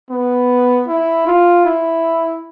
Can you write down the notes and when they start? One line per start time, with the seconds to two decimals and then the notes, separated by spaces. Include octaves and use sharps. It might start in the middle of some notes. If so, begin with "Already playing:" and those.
0.10 B3
0.88 E4
1.27 F4
1.65 E4